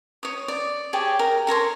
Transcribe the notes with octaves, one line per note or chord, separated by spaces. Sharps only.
C#5 D#6
D5
G4 G#4 C#5 A5
A#4 G5
A4 A#4 C#5 C6